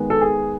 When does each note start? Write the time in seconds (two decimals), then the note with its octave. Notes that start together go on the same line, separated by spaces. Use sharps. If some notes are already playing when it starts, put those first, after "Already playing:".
Already playing: D#3 G#3 B3
0.10 A4
0.21 G#4